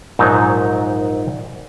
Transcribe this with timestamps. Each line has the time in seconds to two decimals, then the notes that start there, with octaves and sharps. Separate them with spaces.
0.19 A#1 G#2 F#3 D#4 A5